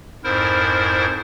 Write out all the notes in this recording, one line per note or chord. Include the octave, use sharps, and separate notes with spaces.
F2 G#2 E4 A#4 C5